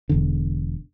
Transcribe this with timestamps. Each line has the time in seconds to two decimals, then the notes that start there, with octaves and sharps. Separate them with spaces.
0.09 E1 E2 D3